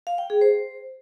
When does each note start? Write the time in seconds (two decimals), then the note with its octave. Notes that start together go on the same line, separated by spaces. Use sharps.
0.07 F5
0.18 G5
0.30 G#4
0.41 C5